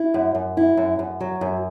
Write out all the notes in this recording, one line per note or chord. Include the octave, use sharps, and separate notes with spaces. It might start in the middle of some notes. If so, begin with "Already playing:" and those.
Already playing: E4
F#2
F#2
E4
F#2
F#2
F#3
F#2